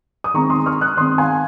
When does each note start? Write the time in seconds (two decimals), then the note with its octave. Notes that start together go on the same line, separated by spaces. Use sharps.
0.24 D#6
0.34 D#3 G#3 C4 A#5 C#6
0.50 C6 D#6
0.66 C#6 F6
0.81 D#6 F#6
0.97 D#3 G#3 C4 C6 D#6
1.18 F5 G#5